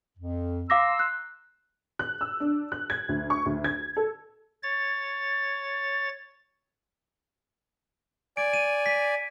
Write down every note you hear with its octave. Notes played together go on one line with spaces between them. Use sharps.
F2
F5 A#5 C6 D6 E6 A#6
F#6
F#6
E6
D4
F#6
G#6
D2
C#6
D2
G#6
A4
C#5 A6
D5 G#5 D7
D#7
B6